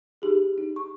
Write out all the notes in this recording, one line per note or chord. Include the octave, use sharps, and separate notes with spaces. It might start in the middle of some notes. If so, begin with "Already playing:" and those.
D#4 G4 G#4
D#4
C#6